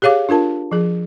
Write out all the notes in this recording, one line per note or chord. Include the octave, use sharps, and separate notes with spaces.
G4 G#4 C#5 F5 D6
D4 F4 A#4 A5
F3 G#4